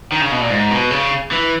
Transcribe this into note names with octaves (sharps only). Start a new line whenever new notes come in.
D#3
C#3
B2
A#2
G#2
B2
C#3
E3